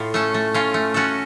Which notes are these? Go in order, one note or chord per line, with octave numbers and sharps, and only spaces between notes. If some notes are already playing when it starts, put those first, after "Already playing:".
Already playing: A2 F4
A3 C#4 A4
A3
C#4 F4
A3
C#4 F#4 A4